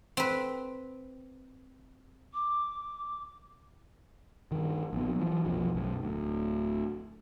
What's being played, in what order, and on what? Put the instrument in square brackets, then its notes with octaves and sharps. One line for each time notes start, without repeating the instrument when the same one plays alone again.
[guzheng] C4 B4
[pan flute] D6
[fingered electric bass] G2 D#3
A#1 B3
E3 F#3
B1 F2 F3
B1 F#2
D1 D2